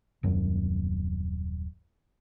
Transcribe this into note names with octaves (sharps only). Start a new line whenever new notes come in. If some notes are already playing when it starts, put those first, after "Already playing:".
D#1 F#2